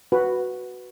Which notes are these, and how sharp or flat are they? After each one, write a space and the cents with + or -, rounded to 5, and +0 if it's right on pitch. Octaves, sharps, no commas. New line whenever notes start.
F#4 +0 B4 +0 F5 +25